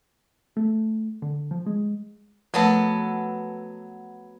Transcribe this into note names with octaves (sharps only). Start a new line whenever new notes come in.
A3
D3
F3
G#3
F3 F#3 A3 B3 A4